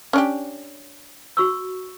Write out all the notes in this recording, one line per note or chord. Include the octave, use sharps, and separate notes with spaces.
C#4 D4 G4
F#4 C#6 E6